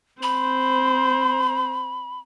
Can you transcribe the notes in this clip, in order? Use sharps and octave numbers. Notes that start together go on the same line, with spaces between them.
C4 C5 B5